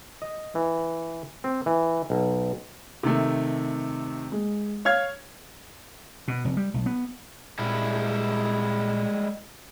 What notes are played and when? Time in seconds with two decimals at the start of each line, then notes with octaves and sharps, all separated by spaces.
0.22 D#5
0.55 E3
1.44 C4
1.66 E3
2.10 B1
3.03 C3 D#3 A3
4.32 G#3
4.85 C#5 F5 F6 G#6
6.28 B2
6.45 F1
6.57 G3
6.74 B1
6.86 B3
7.59 A#2 G3 G#3 E4